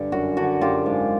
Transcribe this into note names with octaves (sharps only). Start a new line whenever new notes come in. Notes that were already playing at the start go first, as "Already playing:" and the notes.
Already playing: G2 D3
F#2 F#4
D3 F#4
F#2 F4 G4
G#2